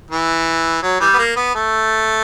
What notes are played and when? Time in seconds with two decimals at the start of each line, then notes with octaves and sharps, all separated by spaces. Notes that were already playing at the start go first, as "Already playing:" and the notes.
0.11 E3
0.83 F#3
1.01 E3 G3
1.13 B3
1.18 A#3
1.36 B3
1.55 A3